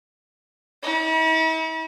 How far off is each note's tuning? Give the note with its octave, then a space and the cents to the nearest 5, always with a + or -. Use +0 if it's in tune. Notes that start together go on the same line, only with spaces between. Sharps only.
E4 -45